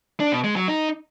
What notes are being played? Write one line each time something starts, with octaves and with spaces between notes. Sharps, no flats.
D4
B2
G#3
F#3
D#4